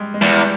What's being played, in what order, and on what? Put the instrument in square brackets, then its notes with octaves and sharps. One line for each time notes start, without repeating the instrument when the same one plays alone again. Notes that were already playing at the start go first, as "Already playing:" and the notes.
Already playing: [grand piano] G3 G#3
G#3
[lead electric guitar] E2 [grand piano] G3